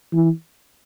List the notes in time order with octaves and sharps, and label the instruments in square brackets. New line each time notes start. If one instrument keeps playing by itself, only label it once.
[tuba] E3